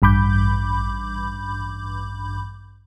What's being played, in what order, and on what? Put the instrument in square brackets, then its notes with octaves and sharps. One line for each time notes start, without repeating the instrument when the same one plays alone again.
[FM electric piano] A1 G2 B5 D6 G6